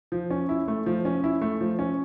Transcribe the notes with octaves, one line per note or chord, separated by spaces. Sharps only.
F3
C#4
E4
A3
F3
C#4
E4
A3
F3
C#4